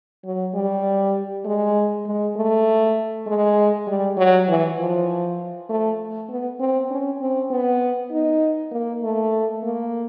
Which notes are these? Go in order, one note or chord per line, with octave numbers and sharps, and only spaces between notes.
F#3
G3
G#3
G#3
A3
G#3
G3
F#3
E3
F3
A3
B3
C4
C#4
C4
B3
D#4
A#3
A3
A#3